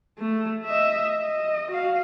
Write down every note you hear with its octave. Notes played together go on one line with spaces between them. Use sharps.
A3
D#5 E5
D#5
F#4 F5